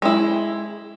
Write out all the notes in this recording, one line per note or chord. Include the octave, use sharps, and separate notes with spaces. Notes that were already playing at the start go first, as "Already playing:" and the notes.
G#3 E4